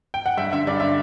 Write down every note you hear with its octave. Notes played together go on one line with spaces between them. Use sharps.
G5
F#5
G2 E5
D3 E5
G2 D5
D3 E5